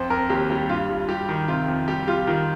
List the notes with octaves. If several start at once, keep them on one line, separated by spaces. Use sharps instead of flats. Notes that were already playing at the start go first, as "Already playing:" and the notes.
Already playing: F2 C5
F2 A#4
D#2 G4
G3 G4
G2 F4
G2
G3 G4
D#3
C3 F4
F2
G3 G4
G3 F4
D#3 F4